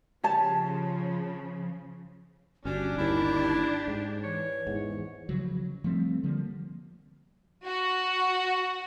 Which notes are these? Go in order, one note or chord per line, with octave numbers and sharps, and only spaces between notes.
C#3 F3 G4 C#5 A5
G1 C#4 D4 F#4 G4
G1 D#2 D#4 E4
G#2
E3 C#5
E2 G#2
C#3 F3 F#3
F3 G3 A3 C4
D3 F3 G3 A#3
F#4